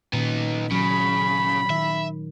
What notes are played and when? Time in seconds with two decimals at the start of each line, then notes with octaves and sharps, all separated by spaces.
0.13 A#2 D#3 B3 C#4 D#4
0.71 C#3 F#3 B5
1.70 D#3 E5